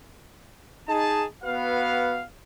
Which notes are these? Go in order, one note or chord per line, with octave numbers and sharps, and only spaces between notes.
D#4 G#4 A5
B3 F#4 B4 F5